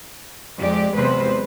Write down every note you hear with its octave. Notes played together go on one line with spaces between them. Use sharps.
F2 G#3 G4 D5
E2 C3 F#3 G#3 B4 C5